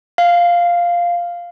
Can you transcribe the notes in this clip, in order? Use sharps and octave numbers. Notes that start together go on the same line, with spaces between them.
F5